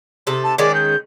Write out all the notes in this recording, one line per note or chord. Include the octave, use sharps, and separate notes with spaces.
C3 D#4 A4
A5
D#3 G#3 C#4 D5
G6